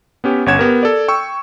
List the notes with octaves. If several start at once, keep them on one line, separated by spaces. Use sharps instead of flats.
B3 C#4 G4
G1 C#4 C#5 F#5 G#6 E7
B3 G4 A#4
A4 D5
G5 C#6 E6